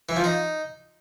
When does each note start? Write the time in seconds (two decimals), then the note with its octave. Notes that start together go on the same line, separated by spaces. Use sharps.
0.09 E3
0.16 F3
0.24 D#4